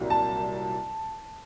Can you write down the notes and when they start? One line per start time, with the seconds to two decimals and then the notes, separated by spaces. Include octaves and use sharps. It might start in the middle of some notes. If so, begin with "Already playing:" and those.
Already playing: C2 A#2 F#3
0.10 A5